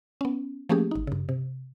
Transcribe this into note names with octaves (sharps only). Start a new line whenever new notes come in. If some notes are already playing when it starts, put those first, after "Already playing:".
B3 C#4
F3 A3 A#3 C#4 G4 G#4
G#1 D#4
G2 C#3
C3